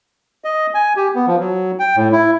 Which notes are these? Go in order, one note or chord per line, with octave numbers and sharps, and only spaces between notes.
D#5
G#5
G4
B3
F3
F#3
G5
A2
E4